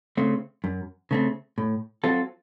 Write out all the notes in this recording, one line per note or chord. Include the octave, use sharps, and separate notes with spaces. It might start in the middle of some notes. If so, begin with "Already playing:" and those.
C#3 A3 C4
F#2
C#3 A3 C4
A2
F#3 C4 F4 A4